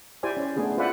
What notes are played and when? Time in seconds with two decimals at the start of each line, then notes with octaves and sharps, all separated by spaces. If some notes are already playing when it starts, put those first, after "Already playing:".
0.23 E4 G4 C5 D5 G#5
0.37 C#4
0.56 A3 B3 D4 G#4
0.78 F4 B4 C5 D5 E5 F#5